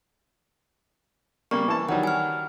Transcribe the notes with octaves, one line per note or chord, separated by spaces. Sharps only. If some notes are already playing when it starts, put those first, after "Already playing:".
C#3 G3 A#3 C#6
E3 A5
D#3 F#3 G3 F#5
G#5 F6